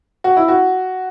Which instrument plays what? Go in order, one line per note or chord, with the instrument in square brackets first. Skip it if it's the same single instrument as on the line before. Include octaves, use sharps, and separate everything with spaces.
[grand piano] F#4
E4
F#4